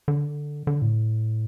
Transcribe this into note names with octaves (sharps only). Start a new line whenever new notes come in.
D3
D3
A2